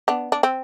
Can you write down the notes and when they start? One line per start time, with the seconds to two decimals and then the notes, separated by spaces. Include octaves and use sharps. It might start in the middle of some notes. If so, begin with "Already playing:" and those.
0.08 B3 D4
0.32 D4
0.43 C4